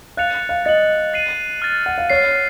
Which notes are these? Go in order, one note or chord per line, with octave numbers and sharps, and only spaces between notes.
F5 F#6 A6 C#7 F7
F5
D#5 A6 C#7 F#7
A6 C7 D#7 F#7
F6 A6 D#7
F#5
F5
C#5 F6 A6 C7